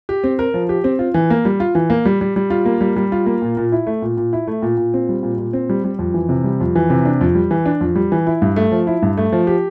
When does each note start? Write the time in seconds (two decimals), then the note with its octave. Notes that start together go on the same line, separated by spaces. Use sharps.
0.09 G4
0.24 C4
0.39 A#4
0.54 F3
0.69 G4
0.84 C4
0.99 F4
1.14 E3
1.30 A#3
1.45 G3
1.60 F4
1.75 E3
1.90 A#3
2.05 G3
2.21 G3
2.36 G3
2.50 F4
2.65 A#3
2.81 G3
2.96 G3
3.12 F4
3.26 A#3
3.42 A#2
3.57 A#2
3.72 E4
3.87 A3
4.02 A#2
4.17 A#2
4.33 E4
4.47 A3
4.62 A#2
4.78 A#2
4.94 C4
5.09 G3
5.23 A#2
5.38 A#2
5.53 C4
5.69 G3
5.84 G3
5.99 F2
6.14 E3
6.29 C3
6.44 G3
6.60 F2
6.75 E3
6.90 C3
7.05 D4
7.21 F2
7.35 G3
7.51 E3
7.66 D4
7.81 F2
7.95 G3
8.12 E3
8.27 E4
8.42 G2
8.56 A3
8.72 F3
8.87 E4
9.02 G2
9.17 A3
9.32 F3
9.47 G4